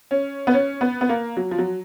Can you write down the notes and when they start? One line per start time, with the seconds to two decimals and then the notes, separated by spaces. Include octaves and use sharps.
0.11 C#4
0.47 B3
0.53 C#4
0.81 B3
1.01 B3
1.09 A#3
1.37 F#3
1.51 F3
1.58 F#3